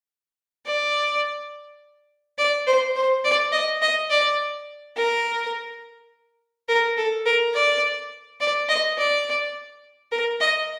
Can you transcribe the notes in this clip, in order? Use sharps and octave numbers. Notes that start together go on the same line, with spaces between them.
D5
D5
C5
C5
D5
D#5
D#5
D5
A#4
A#4
A4
A#4
D5
D5
D#5
D5
A#4
D#5